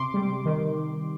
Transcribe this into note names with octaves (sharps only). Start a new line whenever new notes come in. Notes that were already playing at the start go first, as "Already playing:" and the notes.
Already playing: C3 C6 D6
G3
D#3